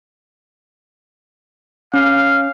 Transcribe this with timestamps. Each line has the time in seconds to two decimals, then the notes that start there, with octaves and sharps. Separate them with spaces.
1.94 C#4 F5